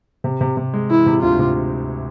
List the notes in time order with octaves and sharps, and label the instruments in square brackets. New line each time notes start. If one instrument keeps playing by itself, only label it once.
[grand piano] C3
C3
C3
G#3
[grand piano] E3 [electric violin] E4
[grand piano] C3
[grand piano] D2 [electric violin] F4
[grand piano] C3